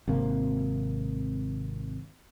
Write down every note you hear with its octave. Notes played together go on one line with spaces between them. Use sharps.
G#1 C3 A#3